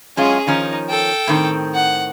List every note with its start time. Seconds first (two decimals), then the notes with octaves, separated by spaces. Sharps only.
0.17 F#2 G#3 C#4 F4 G#4
0.47 D#3 F3 C#4 D#4
0.89 A4 G5
1.27 A2 D#3 C4
1.74 F#5